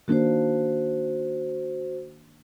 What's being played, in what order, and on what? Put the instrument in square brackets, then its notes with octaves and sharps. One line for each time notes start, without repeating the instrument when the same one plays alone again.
[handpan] D#3 A#3 D4 [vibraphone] F#4 C5